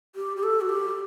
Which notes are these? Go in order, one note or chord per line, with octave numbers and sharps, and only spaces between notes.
G4
G4
A4
F#4
G4